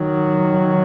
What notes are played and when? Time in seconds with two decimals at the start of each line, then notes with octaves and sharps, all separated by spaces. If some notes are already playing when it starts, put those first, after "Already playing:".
Already playing: D#3 F#3